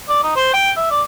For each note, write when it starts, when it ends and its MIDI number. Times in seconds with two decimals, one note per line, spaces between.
0.09 0.23 74
0.24 0.33 63
0.36 0.53 72
0.54 0.72 79
0.77 0.90 76
0.91 1.02 74